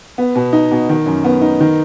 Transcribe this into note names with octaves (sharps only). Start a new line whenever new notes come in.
B3
B2
D#4
B2
D#3
F#2
B3
D#4
D#3